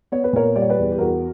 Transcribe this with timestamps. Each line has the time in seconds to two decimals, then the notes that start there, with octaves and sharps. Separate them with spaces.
0.12 B3 C#5
0.24 B4
0.33 A#2 A#4 C#5
0.55 G3 D5
0.62 C#5
0.69 B4 D5
0.78 E2
0.92 G4
0.98 E2 F#4 A#4